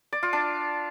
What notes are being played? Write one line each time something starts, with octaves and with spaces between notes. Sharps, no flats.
D5
F4
D4